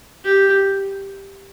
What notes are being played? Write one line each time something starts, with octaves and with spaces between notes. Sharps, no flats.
G4